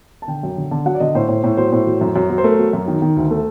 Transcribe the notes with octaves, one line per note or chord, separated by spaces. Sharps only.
A5
D3 G5
F#2
D3
D3 A5
F#3 F#5
D5
D3 D#5
A2 C5
A2
A2
F#3 C5
A2
F#3
F#2
F#2
F#3
C5
A3 A#4
F#3
F#2
D#3
D#3
D2
A3